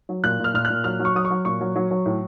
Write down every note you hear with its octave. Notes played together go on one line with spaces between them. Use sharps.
F#3
A#2 F#6
A#2 F6
A#2 F6
F#6
A#2
F#3 F6
F#3
C#6
F#3 D#6
C#6
F#3
A#2 C#6
F#3
F#3
F#3
A2